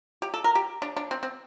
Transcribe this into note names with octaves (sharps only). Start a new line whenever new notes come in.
G4
A4
A#4
G4
D4
D4
C4
C4